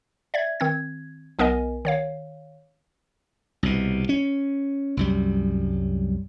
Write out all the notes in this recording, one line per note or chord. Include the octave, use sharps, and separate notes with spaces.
D5 E5 G#6
D#3 C4 G#6
B1 B3 A#4 D#5 G#5
D#3 C#5 F5
C2 B2
C#4
C2 F#2 G3